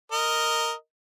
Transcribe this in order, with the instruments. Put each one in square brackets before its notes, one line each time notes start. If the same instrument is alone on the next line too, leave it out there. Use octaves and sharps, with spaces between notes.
[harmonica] A#4 D#5